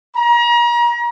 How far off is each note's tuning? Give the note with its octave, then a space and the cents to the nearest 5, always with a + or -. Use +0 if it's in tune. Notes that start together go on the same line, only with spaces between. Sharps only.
A#5 +35